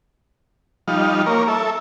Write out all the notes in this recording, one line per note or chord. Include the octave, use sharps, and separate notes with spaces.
F3 G3 D#4 F5
A#3 A#4 C#5
A4 E5